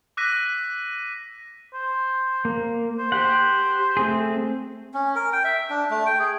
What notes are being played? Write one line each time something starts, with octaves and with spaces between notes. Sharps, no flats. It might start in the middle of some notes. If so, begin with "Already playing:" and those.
D6 E6 F#6 A#6 B6 D#7
C5
A#3
C5
G4 C5 F#5
A3 C4 G#4
C#4
A#4
G5
E5
D4
A3
G5
G#4